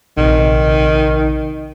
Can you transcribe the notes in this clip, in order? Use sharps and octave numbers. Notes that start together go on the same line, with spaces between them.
A#1 C3 D#3